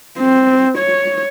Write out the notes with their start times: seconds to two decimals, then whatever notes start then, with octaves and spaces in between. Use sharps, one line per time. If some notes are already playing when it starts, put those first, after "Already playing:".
0.18 C4
0.78 C#5